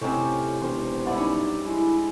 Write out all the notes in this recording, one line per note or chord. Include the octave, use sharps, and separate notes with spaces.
A2 C3 C4 C#4 D#4 G4
E1 C5
G2 E4 D5 F#5
C#4 D#4
G#3 E4